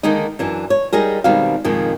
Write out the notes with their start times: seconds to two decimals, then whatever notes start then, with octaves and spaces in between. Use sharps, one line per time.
0.03 D3 D#3 G#3 A#3 D#4
0.39 F#2 E3 D4
0.70 C#5
0.93 G3 D#4 G#4 A#4
1.24 B2 D#3 G3 G#3 C4 F5
1.64 F2 A#2 D#3 G#3